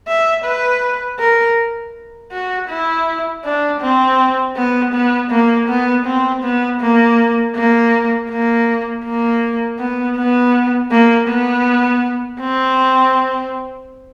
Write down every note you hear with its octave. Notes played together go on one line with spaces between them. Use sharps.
E5
B4
A#4
F#4
E4
D4
C4
B3
B3
A#3
B3
C4
B3
A#3
A#3
A#3
A#3
B3
B3
A#3
B3
C4